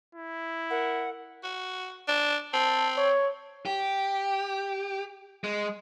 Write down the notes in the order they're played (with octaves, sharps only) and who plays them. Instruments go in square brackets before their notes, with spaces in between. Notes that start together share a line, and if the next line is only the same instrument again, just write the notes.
[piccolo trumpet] E4
[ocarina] A#4 [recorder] F#5
[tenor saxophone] F#4
D4
[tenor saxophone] C4 [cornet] A5
[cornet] C#5
[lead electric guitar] G4
G#3